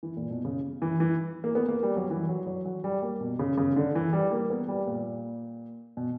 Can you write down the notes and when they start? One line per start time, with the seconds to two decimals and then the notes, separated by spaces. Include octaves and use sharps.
0.03 E3
0.17 A#2
0.31 B2
0.45 C#3
0.82 E3
1.00 E3
1.44 A#3
1.55 B3
1.69 A#3
1.83 G3
1.97 F#3
2.10 E3
2.29 F#3
2.47 F#3
2.66 F#3
2.84 G3
3.02 A#3
3.21 B2
3.39 C#3
3.57 C#3
3.76 D3
3.95 E3
4.13 G3
4.32 A#3
4.50 B3
4.68 G3
4.87 A#2
5.97 B2